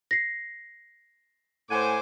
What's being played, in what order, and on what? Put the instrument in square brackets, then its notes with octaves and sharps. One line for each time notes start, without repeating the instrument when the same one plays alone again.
[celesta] A#6 C7
[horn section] A2 F#5 G#5 [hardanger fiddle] C5 D6